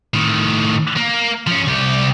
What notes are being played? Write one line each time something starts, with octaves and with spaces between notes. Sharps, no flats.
A2 D#3
A#3
F3 C#4
C2 G4